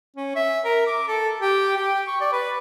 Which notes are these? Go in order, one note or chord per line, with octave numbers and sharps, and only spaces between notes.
C#4
E5
A#4
D6
A4
G4
G4
C#6
D5
B4